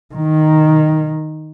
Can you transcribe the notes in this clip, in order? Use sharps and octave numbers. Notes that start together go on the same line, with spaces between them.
D#3